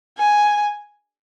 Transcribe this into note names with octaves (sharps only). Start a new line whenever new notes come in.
G#5